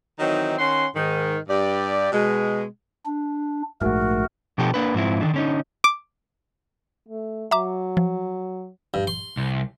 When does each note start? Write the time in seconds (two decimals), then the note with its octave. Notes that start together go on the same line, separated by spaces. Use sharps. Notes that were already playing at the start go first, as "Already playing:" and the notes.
0.19 D#3 E3 F#3 C4 D#4
0.58 D#3 C#4 F#5 C6
0.95 G#2 D#3
1.49 G2 G4 D5
2.12 B2 G#3
3.06 D4
3.82 A#1 G#2 A3 F#4 A#4
4.58 B2 F3 D4 G4 A4
4.74 A#3 D4 B4
4.94 G#2 F3 C4 E4
5.21 D3 D#3 F3 A3 D4
5.34 D3 C#4 D#4
5.84 D6
7.09 A3
7.51 F#3 E5 A#5 D6
7.97 F3
8.94 G2
9.07 C6
9.37 C2